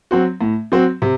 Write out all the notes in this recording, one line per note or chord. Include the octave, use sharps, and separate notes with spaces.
F#3 C4 F#4
A2
F#3 C4 F#4
C3